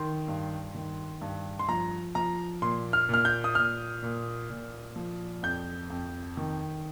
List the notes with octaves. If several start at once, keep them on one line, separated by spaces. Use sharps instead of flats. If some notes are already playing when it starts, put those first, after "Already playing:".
Already playing: D#3 C6
G2
D#3
G2
C6
F3 A#5
F3 A#5
A#2 C6
F6
A#2 F6
G6
D#6
A#2 F6
A#2
A#2
F3
F2 G6
F2
D#3